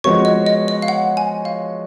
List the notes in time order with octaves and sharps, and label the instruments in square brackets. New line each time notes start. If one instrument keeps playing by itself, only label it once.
[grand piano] F3 G#3 B3 F#4 C#5 [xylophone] C#6
[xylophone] D#5
D#5
D#5
F5
F#5
G#5
F5